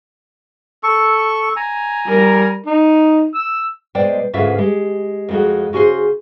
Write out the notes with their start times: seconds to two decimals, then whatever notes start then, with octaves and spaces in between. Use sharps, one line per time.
0.83 A4 C#6
1.56 G#5 A#5
2.06 G3 A#4
2.67 D#4
3.35 E6
3.95 B2 G#3 C5 D5 G5
4.33 D2 G#2 C#3 F4 B4 E5
4.58 G#3 G4
5.29 F2 G#3 F#4
5.73 C#3 F#4 G#4 B4 C5